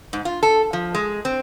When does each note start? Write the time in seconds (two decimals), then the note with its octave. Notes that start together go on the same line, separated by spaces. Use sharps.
0.13 G#2
0.25 F4
0.43 A4
0.73 F3
0.95 G#3
1.25 C4